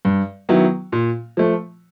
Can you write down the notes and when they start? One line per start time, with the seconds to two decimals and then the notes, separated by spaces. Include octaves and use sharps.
0.05 G2
0.49 D#3 F#3 B3 E4
0.92 A#2
1.37 F3 A3